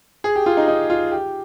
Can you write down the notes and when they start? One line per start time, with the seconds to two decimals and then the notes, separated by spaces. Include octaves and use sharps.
0.24 G#4
0.36 G4
0.46 F4
0.57 D#4
0.68 D#4
0.90 F4
1.12 G4